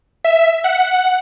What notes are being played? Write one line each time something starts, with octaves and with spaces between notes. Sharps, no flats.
E5
F#5